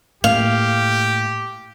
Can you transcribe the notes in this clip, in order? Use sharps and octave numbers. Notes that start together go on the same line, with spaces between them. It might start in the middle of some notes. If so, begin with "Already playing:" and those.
A2 A#3 G4 F5